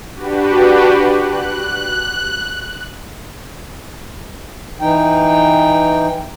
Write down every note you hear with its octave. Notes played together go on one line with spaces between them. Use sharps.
D4 F#4 G4 B4
F#6
E3 D#4 G5